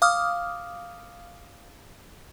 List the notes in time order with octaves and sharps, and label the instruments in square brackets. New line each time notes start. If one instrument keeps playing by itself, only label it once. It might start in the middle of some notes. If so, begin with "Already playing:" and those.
[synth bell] F5 D6 D#6 F6